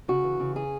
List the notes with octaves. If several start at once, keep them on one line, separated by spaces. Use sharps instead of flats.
C#3 F#4
E3
C#3
G#4